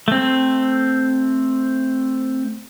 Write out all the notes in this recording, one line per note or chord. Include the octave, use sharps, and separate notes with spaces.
A3 C4